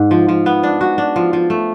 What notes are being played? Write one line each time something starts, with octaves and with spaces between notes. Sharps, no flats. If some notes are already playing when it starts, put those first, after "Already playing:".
Already playing: G#2
F3
F3
B3
D4
F#4
D4
F3
F3
A3